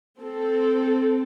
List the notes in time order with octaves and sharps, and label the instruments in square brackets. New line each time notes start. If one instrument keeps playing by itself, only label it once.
[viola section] C4 A4